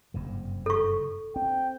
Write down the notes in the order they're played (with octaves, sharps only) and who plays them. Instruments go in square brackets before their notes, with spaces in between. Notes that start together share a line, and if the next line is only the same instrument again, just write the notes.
[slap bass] F#1 G2 C3
[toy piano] A4 C#6
[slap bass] C4 [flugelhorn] G5